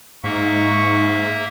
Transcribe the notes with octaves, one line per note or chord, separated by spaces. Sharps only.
G#2 A#3 D#4 E5 C#6